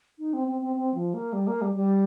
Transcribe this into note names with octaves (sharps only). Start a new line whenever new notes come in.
D#4
C4
C4
C4
C4
F3
A#3
G3
A#3
G3
G3